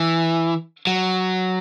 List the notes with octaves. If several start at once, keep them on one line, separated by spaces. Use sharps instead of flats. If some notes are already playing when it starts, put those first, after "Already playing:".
Already playing: E3
F#3